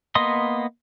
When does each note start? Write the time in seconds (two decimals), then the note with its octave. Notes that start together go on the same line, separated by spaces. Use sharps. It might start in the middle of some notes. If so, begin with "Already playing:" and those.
0.15 A#3 B3 D#5 C6 D#6